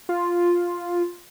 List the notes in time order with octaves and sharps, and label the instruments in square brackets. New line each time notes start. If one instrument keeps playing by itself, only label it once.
[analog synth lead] F4